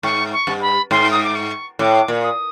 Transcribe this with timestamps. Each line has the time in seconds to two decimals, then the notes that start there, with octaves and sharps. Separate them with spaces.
0.03 G#2 C#6
0.32 C#6
0.47 G2
0.61 B5
0.91 G#2 C6
1.11 D#6
1.23 D6
1.35 C#6
1.79 A2 D6
2.08 A#2
2.23 D#6